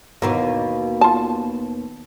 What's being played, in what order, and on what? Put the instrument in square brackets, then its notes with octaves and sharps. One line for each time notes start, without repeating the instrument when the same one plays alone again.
[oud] D#2 B2 A#3 [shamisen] E3 B3
[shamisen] F4 A5